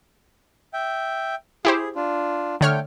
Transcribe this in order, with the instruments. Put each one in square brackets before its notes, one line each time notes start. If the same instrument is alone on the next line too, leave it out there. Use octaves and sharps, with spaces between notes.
[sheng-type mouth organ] E5 G5
[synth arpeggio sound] E4 G4 C5 [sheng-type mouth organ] G#4
[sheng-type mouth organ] D4 F4
[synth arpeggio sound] D3 C#5 F6 [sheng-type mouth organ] A3 G5